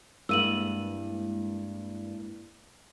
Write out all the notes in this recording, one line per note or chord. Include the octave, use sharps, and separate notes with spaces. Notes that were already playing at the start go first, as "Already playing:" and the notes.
G2 G#3 A#3 B3 E4 E6 D#7 F#7